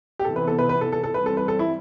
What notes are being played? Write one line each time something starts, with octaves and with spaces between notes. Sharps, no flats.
G4
C3 E3 B3 A4
B4
A4
B4
B4
A4
A4
A4
E3 G3 C4 B4
A4
B4
A4
E4